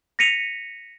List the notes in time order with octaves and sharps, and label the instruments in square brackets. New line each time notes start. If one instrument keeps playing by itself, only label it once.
[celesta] A#6 B6 C#7 D#7 F7